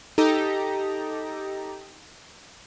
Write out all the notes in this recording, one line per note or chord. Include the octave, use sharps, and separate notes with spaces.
D#4 G4 A4 A#5